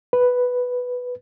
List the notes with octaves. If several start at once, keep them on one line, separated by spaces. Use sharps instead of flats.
B4